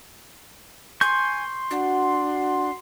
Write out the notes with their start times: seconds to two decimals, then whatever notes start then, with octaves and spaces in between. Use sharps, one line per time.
1.01 G#5 C6 C#6 G6
1.71 D4 F#4 F#5